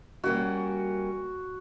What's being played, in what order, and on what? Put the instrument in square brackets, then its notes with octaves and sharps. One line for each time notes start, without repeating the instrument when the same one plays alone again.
[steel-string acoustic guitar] G3 A#3 C#4 [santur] F#4